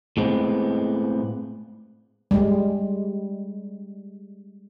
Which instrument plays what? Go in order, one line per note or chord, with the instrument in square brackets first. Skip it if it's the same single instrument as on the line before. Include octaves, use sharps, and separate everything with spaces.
[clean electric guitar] A2 G#3 B3 C4
[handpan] G3 G#3